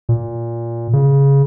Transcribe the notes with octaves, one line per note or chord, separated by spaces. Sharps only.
A#2
C#3